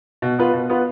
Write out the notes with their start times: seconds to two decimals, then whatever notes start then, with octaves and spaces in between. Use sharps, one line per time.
0.22 B2
0.39 B3 F4 B4
0.54 B2
0.69 B3 F4 B4